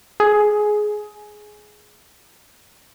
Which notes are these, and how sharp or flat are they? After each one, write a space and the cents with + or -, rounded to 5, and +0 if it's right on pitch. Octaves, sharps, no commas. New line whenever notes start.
G#4 +15